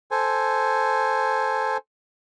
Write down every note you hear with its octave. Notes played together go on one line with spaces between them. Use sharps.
A4 C5 G#5